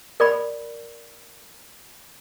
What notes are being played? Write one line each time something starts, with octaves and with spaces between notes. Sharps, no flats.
A#4 D5 B5